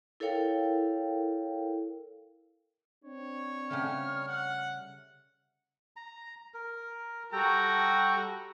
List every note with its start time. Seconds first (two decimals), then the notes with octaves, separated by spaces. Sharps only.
0.20 E4 A4 A#4 C#5 F5 G5
3.05 C4 D4 C#5
3.70 C#3 G3 A3 F6
4.28 F#5
5.96 A#5
6.54 A#4
7.32 G3 F#4 A4 G5 A#5